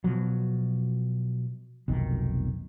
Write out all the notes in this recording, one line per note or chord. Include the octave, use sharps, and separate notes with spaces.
B2 F3 F#3
F1 B1 D#3